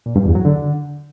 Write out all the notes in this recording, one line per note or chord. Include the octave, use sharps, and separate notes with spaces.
A#2
G2
E2
F#3
D3